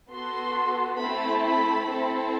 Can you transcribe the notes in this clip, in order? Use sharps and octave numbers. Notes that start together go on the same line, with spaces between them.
B3 F#4 A4 C6
A3 C4 E4 A4 B5
B5
C4 E4 A4